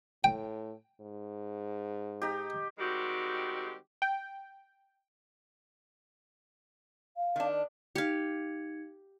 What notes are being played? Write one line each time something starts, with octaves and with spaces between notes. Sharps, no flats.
A2 G5
G#2
D#4 G4
D#3 G3 G#3 C4 F#4 G4
G5
F5
D#3 D4
D5
D#4 G4 F5 G#6 C#7